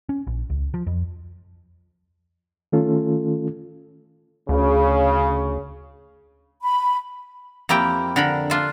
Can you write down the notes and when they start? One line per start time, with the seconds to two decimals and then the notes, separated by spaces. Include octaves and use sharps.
0.09 C#4
0.27 A#1
0.50 C#2
0.74 F3
0.87 F2
2.72 D#3 A3 C#4 F4 A4
4.49 D2 C#3
6.63 B5
7.69 F2 A#3 E4 G4 G5
8.16 D3 A#4 B5
8.50 D4 F4 E5